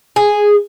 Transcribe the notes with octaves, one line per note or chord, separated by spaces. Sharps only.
G#4